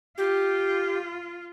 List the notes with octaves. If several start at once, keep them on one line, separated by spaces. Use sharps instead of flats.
F4 G4